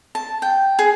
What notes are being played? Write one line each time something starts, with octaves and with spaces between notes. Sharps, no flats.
A5
G5
G#4